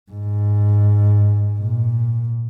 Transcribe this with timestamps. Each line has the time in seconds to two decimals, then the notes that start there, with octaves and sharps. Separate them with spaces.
0.12 G#2
1.59 A#2